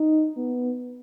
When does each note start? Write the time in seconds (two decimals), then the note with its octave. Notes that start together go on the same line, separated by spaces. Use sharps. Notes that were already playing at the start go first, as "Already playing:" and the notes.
Already playing: D#4
0.37 B3